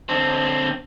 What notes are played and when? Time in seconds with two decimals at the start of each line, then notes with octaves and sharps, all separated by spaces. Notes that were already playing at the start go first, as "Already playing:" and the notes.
0.09 D3 C4